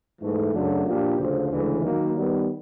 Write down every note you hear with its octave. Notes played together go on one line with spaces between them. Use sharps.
G#2 E3 A3
F#2 C#3 F#3 A3 D4
A#2 F3 A#3 D4 G4
D2 C#3 F3
D2 C#3 E3 G#3
D#3 F#3 A#3
D#3 G3 B3